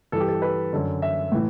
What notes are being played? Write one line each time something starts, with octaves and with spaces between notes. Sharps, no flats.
G2 E3 A4
G4
A4
B4
F#2 D3
E5
A2 E3